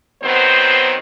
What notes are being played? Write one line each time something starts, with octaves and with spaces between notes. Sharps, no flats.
D#3 F#3 B3 C4 C5